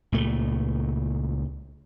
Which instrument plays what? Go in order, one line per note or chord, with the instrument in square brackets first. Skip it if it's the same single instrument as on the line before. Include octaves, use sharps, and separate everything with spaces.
[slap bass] C#2 A#2 A3